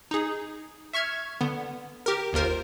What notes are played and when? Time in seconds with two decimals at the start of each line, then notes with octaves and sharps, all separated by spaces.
0.11 D#4 G#4
0.93 E5 C#6 F6 G#6
1.41 D3 B3
2.06 G4 A#4
2.33 G1 D#2 F4 A#4 C5